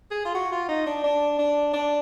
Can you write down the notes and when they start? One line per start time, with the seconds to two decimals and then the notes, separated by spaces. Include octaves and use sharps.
0.11 G#4
0.25 F4
0.35 F#4
0.52 F4
0.69 D#4
0.87 D4
1.04 D4
1.38 D4
1.73 D4